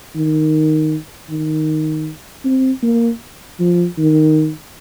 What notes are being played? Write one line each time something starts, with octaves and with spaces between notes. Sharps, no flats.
D#3
D#3
C4
A#3
F3
D#3